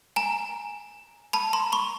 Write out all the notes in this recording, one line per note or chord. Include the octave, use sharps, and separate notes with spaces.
G#5 A#5
A5 B5
A#5 C6
B5 C#6